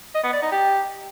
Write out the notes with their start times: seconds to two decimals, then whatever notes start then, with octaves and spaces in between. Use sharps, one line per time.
0.14 D#5
0.24 B3
0.33 D5
0.42 D#4
0.51 G4